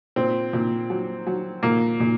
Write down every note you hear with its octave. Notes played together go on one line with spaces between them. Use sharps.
A#2 C4
A#2
F#3
F#3
A#2 A#3
A#2